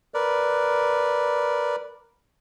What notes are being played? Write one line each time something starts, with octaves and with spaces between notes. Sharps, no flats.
A#4 B4 D5